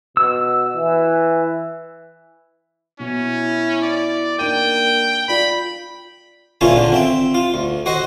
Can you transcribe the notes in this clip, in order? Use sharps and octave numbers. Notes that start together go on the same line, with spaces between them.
B2 E6
E3
B2 C#4 E4
D5
A#3 D4 D#4 G5 D#7
F4 D5 B5
D2 A#2 C#3 C#4 F4 E5
D3
C4 E5 G5
F4
D2
F#4 C5 D#5